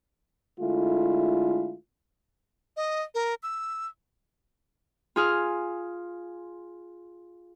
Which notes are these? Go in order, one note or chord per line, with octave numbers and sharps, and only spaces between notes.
D3 G#3 A3 E4 F4
D#5
A#4
E6
F4 G#4 F6